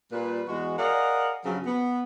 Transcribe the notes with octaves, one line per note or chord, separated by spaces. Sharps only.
A#2 G3 B4
E2 G#3 F#4
G#4 A#4 D5 D#5 F5 F#5
G2 C#3 F3 F#3
B3